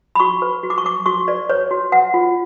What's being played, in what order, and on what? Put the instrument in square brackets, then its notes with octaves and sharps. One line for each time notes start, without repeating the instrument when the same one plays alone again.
[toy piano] B5
F#4 C#6
B4
F#4
D6
C#6
B4 D6
F#4 C#6
B4 D5
B4 C#5
F#4
B4 F#5
F4